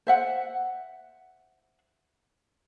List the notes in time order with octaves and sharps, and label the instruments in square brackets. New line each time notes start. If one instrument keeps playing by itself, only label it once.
[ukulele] C5 E5 F#5